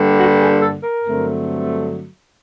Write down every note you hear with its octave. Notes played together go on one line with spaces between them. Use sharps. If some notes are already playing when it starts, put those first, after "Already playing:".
Already playing: G2 D3 G3 A#3
F#4
G#4
A4
A#4
G2 D3 F#3 A3 C4